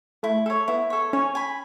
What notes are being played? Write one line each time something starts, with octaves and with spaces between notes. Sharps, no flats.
A3 E4
A4 C#5
B3 E4
A4 C#5
C#4 C#5
G#5 B5